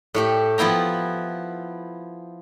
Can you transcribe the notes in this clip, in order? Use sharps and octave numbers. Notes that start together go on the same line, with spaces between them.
A2 A3 G4
F3 B3 E4 G5 A#5